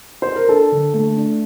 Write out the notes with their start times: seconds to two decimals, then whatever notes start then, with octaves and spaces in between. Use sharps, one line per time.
0.22 C5
0.36 A#4
0.48 D4 A4
0.72 D3
0.94 A3
1.17 D4